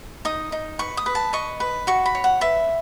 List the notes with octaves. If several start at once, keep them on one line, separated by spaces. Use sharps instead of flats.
D#4 D#6
D#4
B4 C#6
D#6
B4
A5
D#5 C#6
B4
F#4 C#6
B5
C#5
F#5
B4 E5